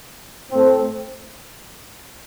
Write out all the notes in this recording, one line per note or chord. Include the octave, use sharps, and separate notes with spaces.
A2 A3 C4